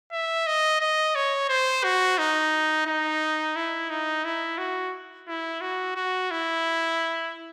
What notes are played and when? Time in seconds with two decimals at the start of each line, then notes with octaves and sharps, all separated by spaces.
0.12 E5
0.47 D#5
0.80 D#5
1.16 C#5
1.49 C5
1.84 F#4
2.18 D#4
2.86 D#4
3.56 E4
3.90 D#4
4.24 E4
4.58 F#4
5.28 E4
5.61 F#4
5.96 F#4
6.31 E4